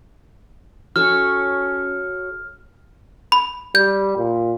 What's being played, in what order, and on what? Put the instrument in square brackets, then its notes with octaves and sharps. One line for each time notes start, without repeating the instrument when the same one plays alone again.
[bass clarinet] C#4 [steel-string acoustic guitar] F#4 A4 C#5 [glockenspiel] F6
[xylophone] B5
[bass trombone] G3 [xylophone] G6
[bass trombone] A#2